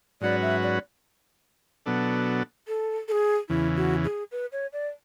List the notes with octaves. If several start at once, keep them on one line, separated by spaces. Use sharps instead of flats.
G#2 F#3 C#4 F#4 B4 D5
E5
D5
B2 F#3 B3 D4 A4
A4
A4
G#4
E2 C#3 E3 E4
F#4
G#4
B4
C#5
D5